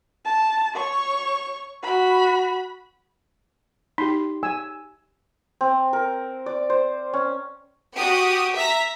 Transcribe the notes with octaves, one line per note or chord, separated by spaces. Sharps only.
A5
C#5 C#6
F#4 B5
D#4 G4 C6
G#5 E6
C4
A#4
D5
C5
C#4
F#4 G4 D#6
E5 A#5 B6